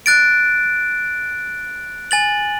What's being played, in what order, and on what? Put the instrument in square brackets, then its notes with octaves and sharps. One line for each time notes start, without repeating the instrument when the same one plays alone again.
[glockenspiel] F#6 A6 D7
G#5 A6 F#7